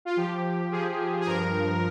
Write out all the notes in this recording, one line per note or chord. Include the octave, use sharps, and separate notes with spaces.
F4
F3 G4
F3
F3 G#4
F3
G#4
G2 A#4
G2